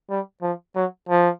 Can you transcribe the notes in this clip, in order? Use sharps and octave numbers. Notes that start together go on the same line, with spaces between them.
G3
F3
F#3
F3